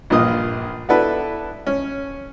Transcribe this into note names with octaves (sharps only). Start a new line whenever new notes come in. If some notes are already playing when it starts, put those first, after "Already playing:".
A#1 G2 A#2 F4 D#5 D#6
B3 D4 E4 F#4 A4 B4
C#4